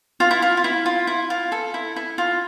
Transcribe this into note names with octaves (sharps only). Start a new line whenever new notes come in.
F4
E4
F4
F4
E4
F4
E4
F4
A4
E4
E4
F4